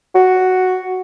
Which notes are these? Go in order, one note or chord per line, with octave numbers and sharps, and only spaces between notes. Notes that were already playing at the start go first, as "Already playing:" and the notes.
F#4